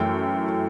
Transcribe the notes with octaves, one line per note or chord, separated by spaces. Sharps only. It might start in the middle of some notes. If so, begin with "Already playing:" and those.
Already playing: F#2 E3 A3 G5